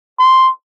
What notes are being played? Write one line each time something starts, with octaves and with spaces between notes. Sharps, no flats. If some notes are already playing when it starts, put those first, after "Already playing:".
C6